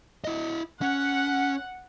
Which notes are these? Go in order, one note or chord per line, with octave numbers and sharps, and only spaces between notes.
E4 D#5
C#4 F#5